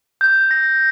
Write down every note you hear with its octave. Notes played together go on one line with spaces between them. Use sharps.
G6
A#6